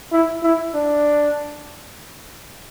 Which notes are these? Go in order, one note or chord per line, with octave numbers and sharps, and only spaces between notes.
E4
E4
D4